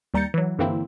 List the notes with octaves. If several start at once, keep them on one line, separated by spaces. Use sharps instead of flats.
D#2 G3 A#5 G6 A6 C#7
E3 F#3
G2 D3 E3 A#3 C4 E4